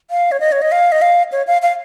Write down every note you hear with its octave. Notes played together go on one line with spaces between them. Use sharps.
F5
C#5
D#5
C#5
D#5
F5
D#5
F5
C#5
F5
F5